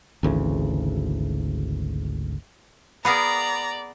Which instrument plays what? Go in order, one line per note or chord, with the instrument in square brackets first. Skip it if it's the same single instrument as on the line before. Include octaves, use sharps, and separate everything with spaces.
[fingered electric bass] G#1 D2 C#3 E3
[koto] B3 G#4 A#4 [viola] D5 [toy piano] F5 B5 D6 [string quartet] A#5